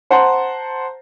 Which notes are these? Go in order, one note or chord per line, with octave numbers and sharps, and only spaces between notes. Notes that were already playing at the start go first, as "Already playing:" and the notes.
C5 F#5 A5 A#5 C6